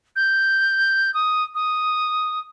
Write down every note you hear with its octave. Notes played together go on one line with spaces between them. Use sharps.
G6
D#6
D#6